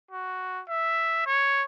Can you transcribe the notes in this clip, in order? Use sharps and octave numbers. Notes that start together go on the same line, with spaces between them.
F#4
E5
C#5